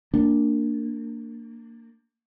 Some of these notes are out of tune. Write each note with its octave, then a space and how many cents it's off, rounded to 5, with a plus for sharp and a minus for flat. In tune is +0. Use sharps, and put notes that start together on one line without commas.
A#3 -20 D4 +0